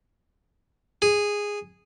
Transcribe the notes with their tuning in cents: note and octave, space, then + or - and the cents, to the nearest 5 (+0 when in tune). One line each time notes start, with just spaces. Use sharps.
G#4 -10